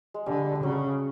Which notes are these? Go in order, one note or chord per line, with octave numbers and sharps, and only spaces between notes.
G#3
D3 G3
G3
C#3 F#3